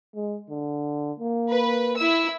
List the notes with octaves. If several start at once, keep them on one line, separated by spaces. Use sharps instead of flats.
G#3
D3
A#3
B4
E4 E6